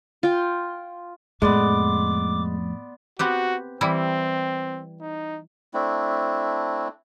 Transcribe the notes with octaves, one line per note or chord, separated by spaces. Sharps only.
F4 G5
F2 A2 G#3 B3 D5 C6 D6
B3 C4 F#4 G4
E3 G3 C4 E4
D#4
A3 C4 D4 E4